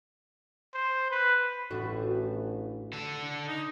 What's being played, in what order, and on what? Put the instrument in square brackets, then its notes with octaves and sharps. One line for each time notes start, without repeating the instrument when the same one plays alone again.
[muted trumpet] C5
B4
[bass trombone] A1 [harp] A2 D4 [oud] F#4
[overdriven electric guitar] D3 A4
[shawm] D#4